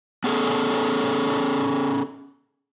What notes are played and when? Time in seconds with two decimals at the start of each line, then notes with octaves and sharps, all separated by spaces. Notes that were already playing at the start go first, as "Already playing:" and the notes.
0.24 B3 C#4 G#4 A4